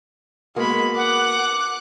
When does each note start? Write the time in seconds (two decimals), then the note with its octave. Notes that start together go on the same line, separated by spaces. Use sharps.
0.56 G#3 A#3 B3 F#4 B5
0.97 F#5 D6 F#6